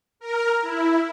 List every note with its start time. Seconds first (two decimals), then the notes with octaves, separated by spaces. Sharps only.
0.20 A#4
0.61 E4